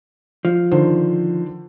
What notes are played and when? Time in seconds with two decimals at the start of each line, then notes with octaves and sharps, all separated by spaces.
0.45 F3
0.71 D3 D#3 C5